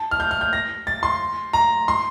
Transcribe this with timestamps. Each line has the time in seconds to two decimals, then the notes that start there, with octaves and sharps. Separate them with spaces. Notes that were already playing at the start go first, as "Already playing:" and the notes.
Already playing: A5
0.11 F6
0.20 G6
0.31 F6
0.41 G6
0.53 A#6
0.87 A6
1.03 C6
1.53 A#5
1.88 C6